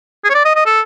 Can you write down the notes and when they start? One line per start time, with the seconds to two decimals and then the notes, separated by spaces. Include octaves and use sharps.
0.24 G#4
0.30 C#5
0.35 D5
0.45 D#5
0.56 D#5
0.66 A4